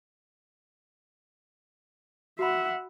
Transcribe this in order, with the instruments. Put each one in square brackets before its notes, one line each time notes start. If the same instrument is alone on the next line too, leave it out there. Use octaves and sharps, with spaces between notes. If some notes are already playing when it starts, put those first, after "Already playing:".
[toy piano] F#4 B5 [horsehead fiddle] E5 F#5